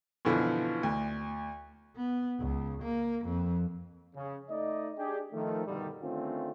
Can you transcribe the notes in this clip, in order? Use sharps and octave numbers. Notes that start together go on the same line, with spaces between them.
F#2 B2 D3 E3 F3
D2
B3
C#2
A#3
F2
C#3
A3 D#4 D5 D#5
D4 G4 G#4
D#3 F3 A3
G2 B2 D3 D#3 G3
D3 D#3 A3 C4 C#4 F4